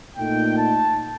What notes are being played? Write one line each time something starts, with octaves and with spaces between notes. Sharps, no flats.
A#2 A3 D#4 G5
A5